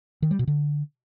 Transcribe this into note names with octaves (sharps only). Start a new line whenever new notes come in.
D#3
G3
B2
D3